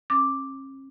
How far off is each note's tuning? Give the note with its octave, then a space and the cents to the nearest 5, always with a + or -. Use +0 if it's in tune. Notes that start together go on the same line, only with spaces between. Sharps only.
C#4 -45 D6 +0